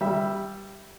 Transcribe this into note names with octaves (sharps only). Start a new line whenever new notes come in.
G3 E5 B5